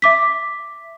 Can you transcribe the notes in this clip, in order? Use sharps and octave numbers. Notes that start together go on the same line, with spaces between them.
E5 D6 B6